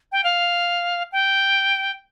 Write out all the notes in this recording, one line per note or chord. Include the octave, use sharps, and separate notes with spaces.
G5
F5
G5